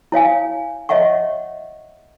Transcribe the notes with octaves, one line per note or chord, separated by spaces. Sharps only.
E4 C#5 F5 G#5
C#5 D#5 E5 F#5 C#6